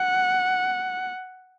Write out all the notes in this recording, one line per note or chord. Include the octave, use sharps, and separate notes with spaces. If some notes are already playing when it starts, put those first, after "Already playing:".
Already playing: F#5